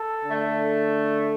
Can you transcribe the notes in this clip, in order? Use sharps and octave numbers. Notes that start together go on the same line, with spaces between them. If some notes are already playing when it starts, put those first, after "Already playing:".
Already playing: A4
D3 A3